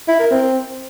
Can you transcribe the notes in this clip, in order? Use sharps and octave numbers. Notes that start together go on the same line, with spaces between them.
E4
A#4
C4